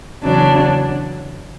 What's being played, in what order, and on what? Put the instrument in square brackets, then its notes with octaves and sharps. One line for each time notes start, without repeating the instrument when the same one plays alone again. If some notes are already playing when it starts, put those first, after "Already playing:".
[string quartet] E2 C#3 F#3 D4